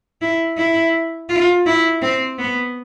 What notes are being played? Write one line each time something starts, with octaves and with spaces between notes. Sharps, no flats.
E4
E4
F4
E4
C4
B3